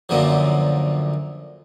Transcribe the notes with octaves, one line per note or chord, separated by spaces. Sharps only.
F#2 A#2 D3 F3